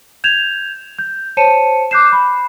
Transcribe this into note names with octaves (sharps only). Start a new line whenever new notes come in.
G6 G#6 E7 F7
G6
C5 C#5 A5 C#7 D#7 E7
D6 F#6 G6 C7 E7
B5